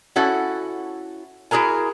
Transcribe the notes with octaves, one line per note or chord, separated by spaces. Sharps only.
C#4 E4 F#4 A4
E4 F#4 G#4 A#4 G#5